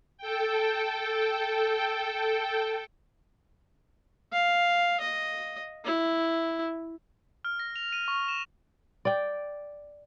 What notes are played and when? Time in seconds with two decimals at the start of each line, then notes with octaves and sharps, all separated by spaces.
0.18 A4 G5
4.33 F5
5.00 D#5
5.84 E4
7.45 F6
7.60 A#6
7.76 F7
7.93 D#7
8.08 C#6
8.28 E7
9.05 D5 G5